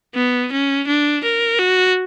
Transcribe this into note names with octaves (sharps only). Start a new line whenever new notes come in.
B3
C#4
D4
A#4
F#4